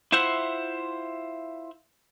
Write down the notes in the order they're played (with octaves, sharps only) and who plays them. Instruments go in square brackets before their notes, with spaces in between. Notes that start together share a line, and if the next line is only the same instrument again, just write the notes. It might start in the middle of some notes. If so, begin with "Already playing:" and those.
[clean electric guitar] E4 F4 C5 E5 F#5